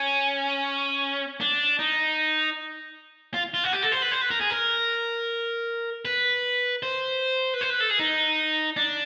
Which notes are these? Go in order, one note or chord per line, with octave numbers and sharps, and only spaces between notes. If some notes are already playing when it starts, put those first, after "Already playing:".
Already playing: C#4
D4
D#4
F4
F4
F#4
G4
A4
C5
B4
C5
B4
A#4
G#4
A#4
B4
C5
B4
C5
B4
A4
G#4
D#4
D4